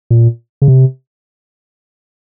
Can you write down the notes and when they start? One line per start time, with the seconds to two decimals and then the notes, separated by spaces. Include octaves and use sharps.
0.11 A#2
0.62 C#3
0.68 C3